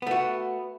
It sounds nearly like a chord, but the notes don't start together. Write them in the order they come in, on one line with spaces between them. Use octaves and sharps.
B3 A3 F#4